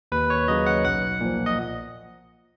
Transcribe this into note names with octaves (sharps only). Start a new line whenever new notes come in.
D#2 B4
C#5
C#3 F#3 D#5
F#5
B1 F#5
A#2 F3
D#5